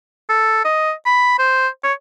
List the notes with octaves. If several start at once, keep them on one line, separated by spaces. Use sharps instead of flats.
A4
D#5
B5
C5
C#5